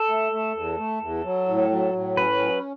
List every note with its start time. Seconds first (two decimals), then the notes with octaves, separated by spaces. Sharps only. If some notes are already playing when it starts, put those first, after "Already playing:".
Already playing: A4
0.09 A3
0.32 A3
0.55 E2
0.78 A3
1.01 E2
1.24 F#3
1.48 A2
1.70 F#3
1.94 A2
2.17 C#4 B4
2.39 F#3